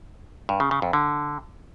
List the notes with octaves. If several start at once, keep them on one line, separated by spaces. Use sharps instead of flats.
G2
C#3
C#3
F2
D3